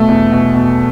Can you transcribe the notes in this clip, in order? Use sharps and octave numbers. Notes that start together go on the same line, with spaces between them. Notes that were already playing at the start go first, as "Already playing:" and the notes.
Already playing: B2 A3
E2
B2
B2